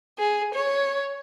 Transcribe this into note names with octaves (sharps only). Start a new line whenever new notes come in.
G#4
C#5